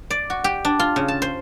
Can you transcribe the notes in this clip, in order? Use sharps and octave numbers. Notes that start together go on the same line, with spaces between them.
D5
F#4
G4
D4
F4
C#3
A5
C5